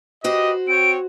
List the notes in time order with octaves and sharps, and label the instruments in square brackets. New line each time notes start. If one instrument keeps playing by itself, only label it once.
[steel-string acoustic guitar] F#4 C5 [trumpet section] G4 B4 D#5
[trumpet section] C4 C#5 G5 [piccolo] D7